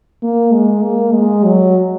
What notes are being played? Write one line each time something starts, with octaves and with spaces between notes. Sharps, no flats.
A#3
G#3
A#3
G#3
F#3